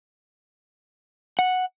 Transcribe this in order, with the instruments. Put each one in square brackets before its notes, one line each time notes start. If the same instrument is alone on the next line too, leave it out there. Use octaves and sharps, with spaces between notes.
[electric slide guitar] F#5